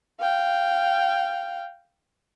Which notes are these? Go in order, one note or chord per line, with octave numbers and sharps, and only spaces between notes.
F5 G5